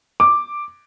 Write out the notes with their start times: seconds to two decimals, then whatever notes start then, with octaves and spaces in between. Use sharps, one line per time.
0.20 D6